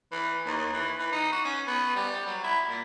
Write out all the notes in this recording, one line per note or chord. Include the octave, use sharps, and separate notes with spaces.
E3
D#2
E3
E3
D#4
F#4
C#4
B3
G3
F#3
E4
A#2